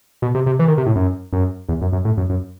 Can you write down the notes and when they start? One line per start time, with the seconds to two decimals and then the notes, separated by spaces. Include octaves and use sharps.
0.22 B2
0.35 C3
0.46 C3
0.59 E3
0.68 D#3
0.78 C3
0.86 A2
0.96 F#2
1.33 F#2
1.69 E2
1.82 F#2
1.93 F#2
2.05 A2
2.17 F#2
2.30 F#2